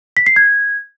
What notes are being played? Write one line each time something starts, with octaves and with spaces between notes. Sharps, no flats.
B6
C7
G#6